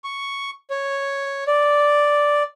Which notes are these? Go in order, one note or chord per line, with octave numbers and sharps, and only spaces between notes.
C#6
C#5
D5